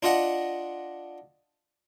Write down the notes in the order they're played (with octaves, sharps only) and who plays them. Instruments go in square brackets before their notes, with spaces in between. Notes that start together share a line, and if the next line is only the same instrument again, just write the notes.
[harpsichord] D4 F4 D#5 F#5